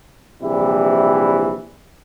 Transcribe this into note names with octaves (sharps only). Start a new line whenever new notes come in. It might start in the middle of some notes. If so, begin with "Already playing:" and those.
A#1 C3 E3 G3 E4